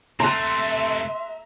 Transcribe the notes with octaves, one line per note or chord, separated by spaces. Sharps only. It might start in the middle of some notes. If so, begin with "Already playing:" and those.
C3 A3 E5 A#5 C6 F#6